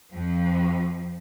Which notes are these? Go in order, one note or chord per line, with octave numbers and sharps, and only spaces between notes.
F2 F3